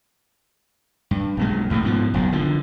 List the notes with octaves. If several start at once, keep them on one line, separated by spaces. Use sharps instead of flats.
G2
B1 A#2 G#3
D2 A2 D#3 E3
G#2 B2 F3
F#1 B1 G2
D3 F3